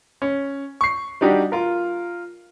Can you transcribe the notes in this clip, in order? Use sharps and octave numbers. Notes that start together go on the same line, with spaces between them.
C#4
C#6 C7
G3 D4 D#4 F#4 G4
F4 A#4